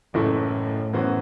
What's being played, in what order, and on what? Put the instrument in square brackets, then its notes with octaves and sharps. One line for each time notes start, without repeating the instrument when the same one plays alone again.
[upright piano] F#1 F#2 E3 A3 E4 [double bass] A2
[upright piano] F#2 E3 B3 F#4 C5